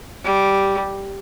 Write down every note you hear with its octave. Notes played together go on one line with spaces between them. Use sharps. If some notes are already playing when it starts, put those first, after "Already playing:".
G3